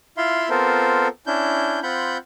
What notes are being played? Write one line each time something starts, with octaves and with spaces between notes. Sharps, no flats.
E4 F4 E5 F5 C6
B3 C4 F4 A4 A#4 C5
C#4 D4 E4 G6
C4 F4 F#5 B5 G6